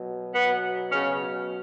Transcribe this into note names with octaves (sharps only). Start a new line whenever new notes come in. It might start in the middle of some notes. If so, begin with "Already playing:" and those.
Already playing: B2 F#3
B3
C#3 C#4